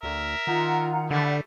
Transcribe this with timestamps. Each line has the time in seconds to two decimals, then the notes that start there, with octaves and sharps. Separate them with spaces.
0.03 D2 A#4 E5
0.47 D#3 F4 F#5 A#5
1.11 D3 G3 A3 E4 F#5